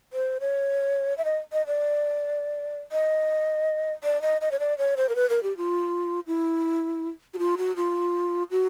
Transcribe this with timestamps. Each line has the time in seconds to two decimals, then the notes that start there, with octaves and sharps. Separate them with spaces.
0.13 C5
0.40 C#5
1.18 E5
1.25 D#5
1.53 D#5
1.67 D5
2.92 D#5
4.04 D5
4.22 D#5
4.41 D#5
4.51 C#5
4.60 D5
4.78 C#5
4.97 C5
5.09 A#4
5.16 B4
5.30 A#4
5.43 G4
5.57 F4
6.27 E4
7.34 F#4
7.39 F4
7.58 F#4
7.76 F4
8.51 F#4